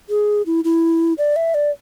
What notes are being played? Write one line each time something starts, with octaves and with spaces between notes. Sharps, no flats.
G#4
E4
E4
D5
E5
D5